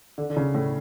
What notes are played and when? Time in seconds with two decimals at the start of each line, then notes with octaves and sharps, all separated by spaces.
0.18 D3
0.30 D3
0.37 C#3
0.55 A2